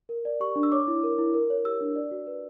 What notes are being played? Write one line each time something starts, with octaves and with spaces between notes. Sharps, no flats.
A#4
D5
G4 C#6
D4
E6
C#5 D6
E4
A#4
E4
A#4
C#5
G4 E6
D4
D5
F#4
B4